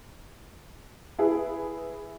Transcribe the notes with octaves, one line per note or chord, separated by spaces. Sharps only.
E4 G#4 B4